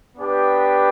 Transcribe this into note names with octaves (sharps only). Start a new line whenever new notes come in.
B3 D4 G4 B4